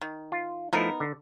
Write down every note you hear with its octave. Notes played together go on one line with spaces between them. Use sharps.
D#3
F4
F3 A3 B3 D#4 E4 A#4
D3